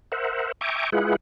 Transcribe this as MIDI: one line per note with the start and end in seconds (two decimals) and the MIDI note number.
0.12 0.52 70
0.12 0.52 72
0.12 0.52 76
0.12 0.52 78
0.61 0.90 76
0.61 0.90 79
0.61 0.90 80
0.61 0.90 82
0.61 0.90 85
0.61 0.90 86
0.92 1.16 56
0.92 1.16 64
0.92 1.16 65
0.92 1.16 68
0.92 1.16 71
0.92 1.16 78